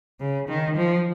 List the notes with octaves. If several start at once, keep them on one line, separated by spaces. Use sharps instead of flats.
C#3
D#3
F3